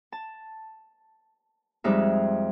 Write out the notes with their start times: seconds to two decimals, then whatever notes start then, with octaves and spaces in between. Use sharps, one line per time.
0.12 A5
1.84 F2 G3 G#3 D#4 F4 E5